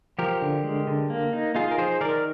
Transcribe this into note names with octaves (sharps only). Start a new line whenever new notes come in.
F3 G4 A#4
D3
G#3
D3
A#3
D#4
D#4 F4 G#4
A#4
F3 G#4 C5
D#3 A#4 D5